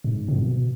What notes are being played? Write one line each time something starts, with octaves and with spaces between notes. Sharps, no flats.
G#2
C3
B2